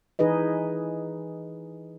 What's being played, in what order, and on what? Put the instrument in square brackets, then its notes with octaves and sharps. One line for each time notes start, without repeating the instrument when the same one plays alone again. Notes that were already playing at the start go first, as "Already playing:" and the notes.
[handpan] E3 D#4 G#4 B4 D#5